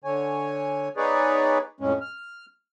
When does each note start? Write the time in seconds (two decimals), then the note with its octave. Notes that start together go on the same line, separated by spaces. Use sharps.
0.04 D3 C#5 G#5
0.97 B3 D#4 G#4 B4 C#5 D5
1.81 F2 A2 G#3 C#4
2.01 F6